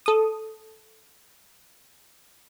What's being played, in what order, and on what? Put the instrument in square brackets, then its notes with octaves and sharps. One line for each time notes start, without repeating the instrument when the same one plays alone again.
[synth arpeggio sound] A4 D#6